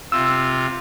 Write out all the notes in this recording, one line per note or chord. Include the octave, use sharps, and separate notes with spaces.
C3 F4 E6